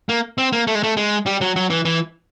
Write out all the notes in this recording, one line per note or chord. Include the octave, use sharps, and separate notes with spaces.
A#3
C4
A#3
A3
G#3
A3
G#3
G3
F#3
F#3
E3
E3